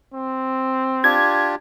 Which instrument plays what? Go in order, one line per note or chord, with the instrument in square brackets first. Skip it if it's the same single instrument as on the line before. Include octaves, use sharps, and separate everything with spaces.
[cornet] C4
[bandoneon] D4 F4 G4 [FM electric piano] G#6